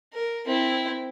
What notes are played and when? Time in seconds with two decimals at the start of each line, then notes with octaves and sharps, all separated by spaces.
0.13 A#4
0.46 C4 E4